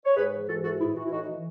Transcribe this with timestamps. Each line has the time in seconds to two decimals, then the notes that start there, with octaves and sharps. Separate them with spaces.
0.05 C#5
0.16 G#2 G#4 B4
0.33 E3
0.48 G#2 F#4 A4
0.64 E3 F#4 A4
0.80 A2 E4 G#4
0.96 E3 F#4
1.05 E4
1.11 A2 D#4 F#4
1.28 E3